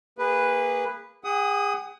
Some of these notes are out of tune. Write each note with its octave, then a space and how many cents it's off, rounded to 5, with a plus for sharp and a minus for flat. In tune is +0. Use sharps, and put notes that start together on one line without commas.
A#3 -15 G#4 -30 B4 +0
G#4 -35 F#5 +25 D#6 +15